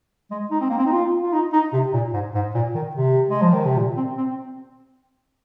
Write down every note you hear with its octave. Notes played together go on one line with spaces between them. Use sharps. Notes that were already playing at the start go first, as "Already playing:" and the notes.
G#3
D#4
C4
A#3
C4
D#4
F4
F4
D#4
D#4
C3
A#2
G#2
G#2
A#2
D#3
C3
G#3
F3
D#3
C3
A#2
C4
C4